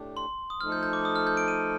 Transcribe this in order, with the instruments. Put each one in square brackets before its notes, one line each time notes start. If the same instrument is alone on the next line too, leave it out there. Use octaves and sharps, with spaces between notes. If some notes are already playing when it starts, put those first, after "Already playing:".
Already playing: [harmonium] A2 A3 D4 G4
[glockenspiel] C6
D#6
[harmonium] F3 A3 D#4 A4 [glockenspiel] F6
[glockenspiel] G6
G6
D6
D#6
F6
G6
D7
D#7